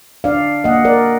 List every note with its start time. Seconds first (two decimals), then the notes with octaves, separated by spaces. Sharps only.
0.24 D4 D5 F5
0.64 A#3 D#5 F#5
0.85 A#4 D5